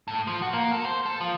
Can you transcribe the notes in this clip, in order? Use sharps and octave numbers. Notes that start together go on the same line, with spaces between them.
A2
F3
F#4
A#3
A4
C5
A4
F3